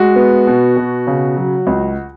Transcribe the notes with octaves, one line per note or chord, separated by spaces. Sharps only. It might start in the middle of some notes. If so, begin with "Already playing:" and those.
Already playing: G#3 F#4
B3
B2
B2
C#3
F#3
C#2